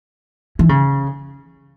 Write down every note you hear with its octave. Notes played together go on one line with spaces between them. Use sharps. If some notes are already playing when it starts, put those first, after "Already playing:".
E3
C#3